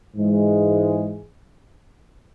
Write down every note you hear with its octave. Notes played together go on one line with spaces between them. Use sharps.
G#2 E3 G#3